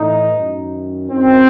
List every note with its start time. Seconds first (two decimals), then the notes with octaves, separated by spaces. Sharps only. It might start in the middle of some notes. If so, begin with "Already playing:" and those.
Already playing: A2 E3 D#4
0.32 F#2 D#3
1.11 F#2 D#3 C4